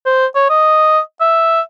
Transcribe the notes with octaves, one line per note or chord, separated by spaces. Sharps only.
C5
C#5
D#5
E5